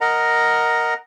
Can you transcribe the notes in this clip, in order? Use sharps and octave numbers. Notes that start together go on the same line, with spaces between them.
A#4 D#5 F#5 A#5